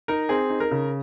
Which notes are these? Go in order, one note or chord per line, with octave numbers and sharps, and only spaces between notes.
D#4 A#4
C4 G#4
D#4
A#4
C#3